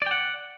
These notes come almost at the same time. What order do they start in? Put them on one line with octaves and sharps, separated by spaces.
D5 G5 F#5